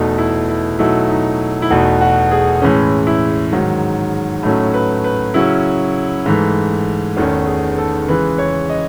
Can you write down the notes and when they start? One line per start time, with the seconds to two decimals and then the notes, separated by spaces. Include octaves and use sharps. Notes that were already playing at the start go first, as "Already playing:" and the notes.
Already playing: E2 B2 A3 D#4
0.18 E4
0.49 E4
0.79 B2 F#3 A3 D#4 E4
1.09 D#4
1.62 E4
1.70 E2 B2 A3 D#4 F#4
2.01 F#4
2.31 G#4
2.62 A2 E3 G#3 C#4
3.07 E4
3.52 G#2 D#3 F#3
4.43 A2 F#3 A3 C#4 D#4
4.74 B4
5.04 B4
5.34 C#3 F#3 C#4 E4
6.26 G#2 E3 A3
7.16 E2 D#3 A3 C#4 F#4
7.47 G#4
7.78 A4
8.08 C#3 E3 G#3 B4
8.38 C#5
8.69 D#5